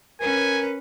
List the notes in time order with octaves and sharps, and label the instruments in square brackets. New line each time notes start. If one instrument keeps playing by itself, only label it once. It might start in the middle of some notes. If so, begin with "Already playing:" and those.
[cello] C#4 B4 [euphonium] A#4 [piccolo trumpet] G#5